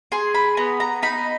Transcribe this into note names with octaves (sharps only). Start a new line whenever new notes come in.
G#4 C6
B5
B3 A#5
A#5
D#4 B5